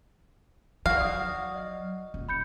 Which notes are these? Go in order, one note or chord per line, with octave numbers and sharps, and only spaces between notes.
F#3 F#4 F5
D5 F#5 D#6
D#5
D#1
B5 G6 C#7